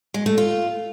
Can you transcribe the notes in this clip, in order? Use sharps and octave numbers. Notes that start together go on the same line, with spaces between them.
G#3
A3
F4